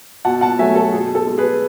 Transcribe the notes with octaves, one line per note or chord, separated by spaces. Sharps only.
B2 F#5 A5
F#5 A5
F#3 A3 E5 G#5
A4
B2 G#4
A4
G#3
G#4 B4